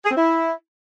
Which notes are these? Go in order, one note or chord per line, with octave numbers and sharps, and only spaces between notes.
G#4
C4
E4